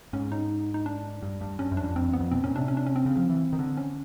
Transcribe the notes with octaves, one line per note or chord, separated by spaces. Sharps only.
G#2 C#4
D#4
D#4
D4
G2
G2
G2 C#4
F#2
D4
F2
F2 C4
E2
B3
F2
B2 C4
A#2 C#4
C3 D4
C#4
D4
C#4
C4
C#3
F3
E3
D#3
D3
C#4